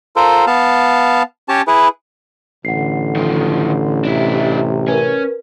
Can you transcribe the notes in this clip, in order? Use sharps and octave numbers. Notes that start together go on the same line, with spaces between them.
F4 A4 A#4 C5
B3 F5 A5
C#4 G4 C#5 A5
E4 G#4 B4
A1 D3 F#5 C7
D#3 F3
C3 D4 E4
C#4 A#4 B4